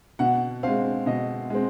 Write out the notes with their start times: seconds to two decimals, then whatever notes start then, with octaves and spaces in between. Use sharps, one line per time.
0.19 B2 F#5
0.63 G#3 C4 F5
1.06 B2 D#5
1.50 G#3 C4